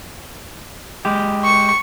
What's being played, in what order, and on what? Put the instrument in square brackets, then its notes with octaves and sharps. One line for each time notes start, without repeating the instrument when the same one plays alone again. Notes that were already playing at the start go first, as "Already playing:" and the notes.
[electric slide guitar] G#3 G4
[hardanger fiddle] C#6